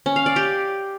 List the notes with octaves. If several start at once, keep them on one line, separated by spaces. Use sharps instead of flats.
C#4
F5
D5
G4